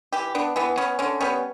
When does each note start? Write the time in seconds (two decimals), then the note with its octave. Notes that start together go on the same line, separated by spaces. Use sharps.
0.12 E3 G4
0.35 B3 D4
0.56 E3 B3
0.78 B3 C#4
0.99 D3 C#4
1.20 G3 B3 C#4